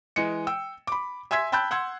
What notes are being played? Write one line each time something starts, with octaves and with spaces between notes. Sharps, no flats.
E3 G#3 D#5 C#7
G5 E6
B5 D6
E5 G#5 C6 E6 G#6 B6
G5 A5 B5 E6 F#6 G6
F#5 C6 E6 G#6